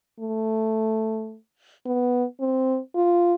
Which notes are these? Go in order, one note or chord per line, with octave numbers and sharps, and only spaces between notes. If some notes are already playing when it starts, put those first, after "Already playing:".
A3
B3
C4
F4